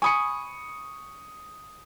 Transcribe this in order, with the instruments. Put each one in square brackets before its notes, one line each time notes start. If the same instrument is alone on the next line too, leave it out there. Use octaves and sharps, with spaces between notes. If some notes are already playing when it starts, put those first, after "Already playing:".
[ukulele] G#5 B5 [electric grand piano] C#6 D#6 C#7